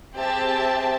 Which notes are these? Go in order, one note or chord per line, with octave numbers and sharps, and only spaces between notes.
C4 G4 G#4 E5 A5